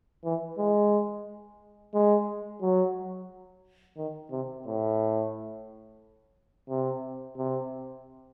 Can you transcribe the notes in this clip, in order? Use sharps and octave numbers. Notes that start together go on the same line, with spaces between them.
E3
G#3
G#3
F#3
D#3
C3
A2
C3
C3